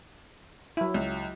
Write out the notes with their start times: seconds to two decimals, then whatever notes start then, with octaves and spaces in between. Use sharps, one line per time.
0.77 F#3 E4
0.94 C#2